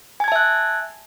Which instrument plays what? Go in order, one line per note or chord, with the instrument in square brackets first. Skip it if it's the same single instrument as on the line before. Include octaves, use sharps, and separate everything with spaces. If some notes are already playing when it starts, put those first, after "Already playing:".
[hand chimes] G#5
G#6
A5
E5
F#6